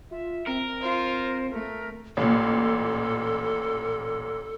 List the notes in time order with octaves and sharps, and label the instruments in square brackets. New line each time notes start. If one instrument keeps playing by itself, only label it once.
[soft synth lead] F4 [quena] E5
[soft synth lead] C4 [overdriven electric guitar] A#4
[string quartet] F4 [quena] C5
[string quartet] A3 [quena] A#4
[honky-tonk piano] A1 A#2 [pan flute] A4